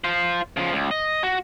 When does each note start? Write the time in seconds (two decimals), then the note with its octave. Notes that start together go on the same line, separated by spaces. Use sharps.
0.04 F4 C5
0.57 C#3 F3
0.73 C#2
0.91 D#5
1.23 F#4